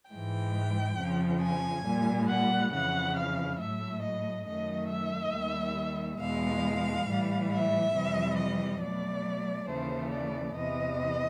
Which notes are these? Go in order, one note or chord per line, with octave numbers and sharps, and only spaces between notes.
G#2 E3 G#3 G5
F2 C#3 F3
G#5
A#2 G3
F#5
F2 C#3 E3 F#5
F5
A2 F#3 A3 E5
D#5
F#2 D#3 F#3 A3 D#5
E5
D#2 D#3 G3
E2 B2 G#3 F5
A2 E3 G3
E5
F2 C3 E3 G3
D#5
B2 F#3 A3 D5
D#2 C#3 E3 A3 C5
D5
E2 C3 E3 D#5